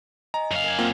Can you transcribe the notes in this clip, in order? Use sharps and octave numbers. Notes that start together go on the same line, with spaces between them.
D#5 G#5 A#5
F#2 F5
A#4 G#5 G#6
A#3 C4 F4 F#5 G5